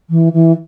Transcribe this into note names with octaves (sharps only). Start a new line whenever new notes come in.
E3
E3